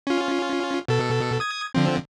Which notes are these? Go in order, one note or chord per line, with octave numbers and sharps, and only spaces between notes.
C#4 F4
B2 A4
D#6 G#6
D3 F3 C4